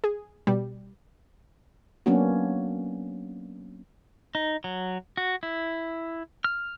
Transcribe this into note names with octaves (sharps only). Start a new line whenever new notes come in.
G#4
B2 G3
F#3 A#3 B3 C#4 D4 F#4
D#4
F#3
F#4
E4
F6